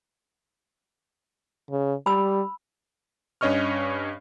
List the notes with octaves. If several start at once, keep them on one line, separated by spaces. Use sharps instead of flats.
C#3
G3 B5 E6
G2 C#4 C#5 D#5 C#6 F6